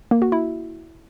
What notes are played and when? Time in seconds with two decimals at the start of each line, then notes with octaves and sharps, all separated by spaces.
0.11 A#3
0.22 F#4
0.32 E4